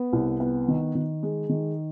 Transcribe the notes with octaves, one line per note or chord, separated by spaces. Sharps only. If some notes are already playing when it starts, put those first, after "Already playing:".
Already playing: B3
C2
B3
D#3
D#3
G#3
D#3